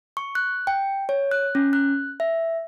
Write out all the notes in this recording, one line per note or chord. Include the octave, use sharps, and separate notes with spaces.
C#6
F#6
G5
C#5
F#6
C#4
F#6
E5